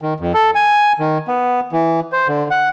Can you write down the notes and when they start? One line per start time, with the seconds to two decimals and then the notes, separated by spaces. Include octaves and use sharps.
0.02 D#3
0.20 F2
0.34 A4
0.55 G#5
0.99 D#3
1.28 B3
1.72 E3
2.12 C5
2.28 D3
2.51 F#5